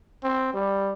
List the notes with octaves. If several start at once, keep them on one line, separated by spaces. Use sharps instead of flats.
C4
G3